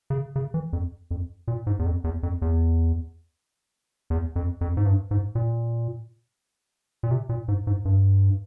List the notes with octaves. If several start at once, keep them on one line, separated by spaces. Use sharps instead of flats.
C#3
C#3
E3
F2
F2
A#2
G#2
E2
F2
E2
F2
E2
E2
F2
F2
G#2
G2
G#2
A#2
A#2
C3
A#2
G#2
G#2
G2